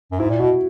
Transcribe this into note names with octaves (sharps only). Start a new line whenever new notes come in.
F#2
G#2 E4
A#2
B2 F#4